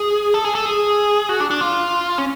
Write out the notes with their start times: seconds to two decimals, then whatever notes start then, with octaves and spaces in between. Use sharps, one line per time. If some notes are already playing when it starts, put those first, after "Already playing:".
Already playing: G#4
0.34 A4
0.44 G#4
0.55 A4
0.66 G#4
1.29 F#4
1.40 D4
1.50 D4
1.61 F4
2.18 C#4